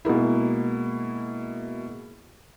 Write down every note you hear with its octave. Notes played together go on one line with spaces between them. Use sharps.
B2 G#3 A#3 E4